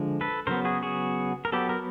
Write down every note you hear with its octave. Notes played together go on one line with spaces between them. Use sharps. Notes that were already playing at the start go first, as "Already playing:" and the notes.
Already playing: D3 F3 G#3
A4 B4
C#3 F#3 B3 A#4 C5
F#4 G#4
F#4 G#4
A#4
F#3 B3 G4 A4
A#4